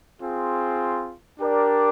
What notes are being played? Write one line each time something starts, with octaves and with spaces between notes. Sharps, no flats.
C4 F4 G#4
D4 G4 A#4 D5